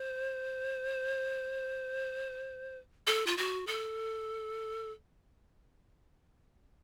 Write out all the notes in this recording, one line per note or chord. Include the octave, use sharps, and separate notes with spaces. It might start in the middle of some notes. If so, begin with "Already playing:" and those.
Already playing: C5
A4
F4
F#4
A4